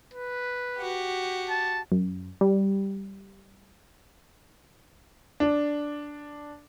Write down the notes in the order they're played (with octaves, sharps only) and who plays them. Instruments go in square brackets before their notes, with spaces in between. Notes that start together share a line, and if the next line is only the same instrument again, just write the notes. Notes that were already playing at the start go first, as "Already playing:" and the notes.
[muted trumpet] B4
[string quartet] F#4 G4
[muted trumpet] A5
[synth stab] F#2
G3
[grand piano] D4